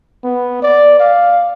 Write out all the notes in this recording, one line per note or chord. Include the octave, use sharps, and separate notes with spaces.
B3
D5
F5